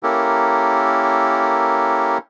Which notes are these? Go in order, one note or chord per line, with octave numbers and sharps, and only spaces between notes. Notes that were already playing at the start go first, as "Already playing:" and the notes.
A#3 C#4 E4 G4 A4 A#4